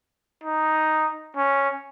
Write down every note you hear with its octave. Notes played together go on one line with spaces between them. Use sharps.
D#4
C#4